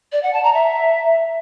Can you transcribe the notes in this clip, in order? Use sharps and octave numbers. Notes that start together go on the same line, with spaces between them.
D5
F#5
A5
A#5
E5